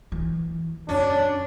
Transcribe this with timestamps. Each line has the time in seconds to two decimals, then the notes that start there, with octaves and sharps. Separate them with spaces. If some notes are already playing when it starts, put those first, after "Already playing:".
0.12 E3
0.89 F#2 C#4 D4